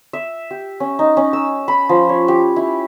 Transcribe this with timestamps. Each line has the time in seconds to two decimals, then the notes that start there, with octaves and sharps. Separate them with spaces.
0.13 E5
0.51 G4
0.80 C#4
0.99 D#4
1.17 C#4
1.33 E6
1.68 B5
1.89 F3
2.09 C#5
2.28 G4
2.56 E4